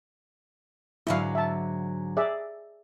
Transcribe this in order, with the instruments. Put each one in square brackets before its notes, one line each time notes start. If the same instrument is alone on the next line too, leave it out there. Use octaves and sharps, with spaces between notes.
[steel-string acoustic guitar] G#2 D3 F#3 [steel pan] E4 F5
[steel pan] E5 A5
G#4 D5 E5